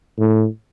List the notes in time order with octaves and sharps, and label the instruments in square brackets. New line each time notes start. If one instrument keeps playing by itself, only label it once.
[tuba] A2